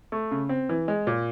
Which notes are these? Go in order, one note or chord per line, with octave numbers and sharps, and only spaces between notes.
A3
C#3
C4
E3
G#3
A#2